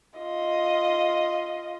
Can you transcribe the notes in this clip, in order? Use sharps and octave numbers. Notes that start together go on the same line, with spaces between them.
F4 D#5